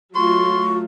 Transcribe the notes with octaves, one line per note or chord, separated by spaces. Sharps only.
F#3 A3 F4 C6 C#6